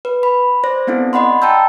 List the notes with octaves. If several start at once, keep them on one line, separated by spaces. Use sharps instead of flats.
B4
B5
C5 D5 A#6
B3 C4 D4 E4 A4
D5 D#5 F#5 B5 C6
G5 A5 A#5 E6 G6